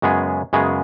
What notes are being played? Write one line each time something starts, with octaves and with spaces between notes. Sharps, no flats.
F#2 C#3 G#3 B3 G#4
F#2 C#3 G#3 B3 G#4